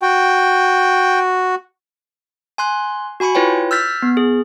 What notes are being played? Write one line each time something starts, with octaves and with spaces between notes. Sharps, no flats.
F#4 G5
G#5 C6 F#6
F#4 G#5 B5 C#6 C#7
E4 F4 B4 C#5 G5
E6 F6 G6 A6 B6
B3
G#4